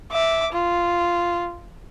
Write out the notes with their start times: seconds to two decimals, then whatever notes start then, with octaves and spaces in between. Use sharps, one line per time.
0.12 E5 D6
0.53 F4